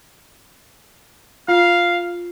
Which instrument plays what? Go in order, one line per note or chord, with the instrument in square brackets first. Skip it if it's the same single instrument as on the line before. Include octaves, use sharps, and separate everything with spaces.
[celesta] F4 [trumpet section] F5